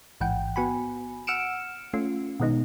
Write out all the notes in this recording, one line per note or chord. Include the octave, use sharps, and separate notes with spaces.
A1 G#2 E3 F#5 G5
B3 F#4 G#5 B5
F#5 E6 F6 C#7 D7 E7
A3 C#4 F4
B2 D#3 G#3 B3 D#4